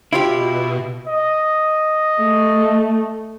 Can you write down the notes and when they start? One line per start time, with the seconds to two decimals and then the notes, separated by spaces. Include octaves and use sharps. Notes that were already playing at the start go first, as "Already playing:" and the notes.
0.13 B2 E4 F4 G4
1.07 D#5
2.21 A3